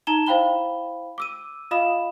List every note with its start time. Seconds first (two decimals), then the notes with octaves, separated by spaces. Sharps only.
0.07 D#4 A5 A#5 E7 G7
0.26 E4 C5 F5 G5 B5 G7
1.18 D6 E6 D#7
1.71 F4 D#5 F5 B5 D#6 E7